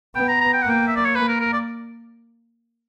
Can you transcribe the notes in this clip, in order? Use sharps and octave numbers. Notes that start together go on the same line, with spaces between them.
B3 G5
A#5
A#5
G5
F#5
A#3 G5
E5
D5
C#5
A#3 B4
A#4
A#4
D5